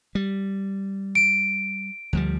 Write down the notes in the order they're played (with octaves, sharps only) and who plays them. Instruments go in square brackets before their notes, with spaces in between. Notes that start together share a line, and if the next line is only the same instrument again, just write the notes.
[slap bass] G3
[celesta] D7
[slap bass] D2 F3 G3